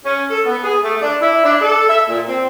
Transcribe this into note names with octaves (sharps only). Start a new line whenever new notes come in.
C#4
A4
B3
G#4
A3
D4
E4
D4
A4
E5
A#2
C4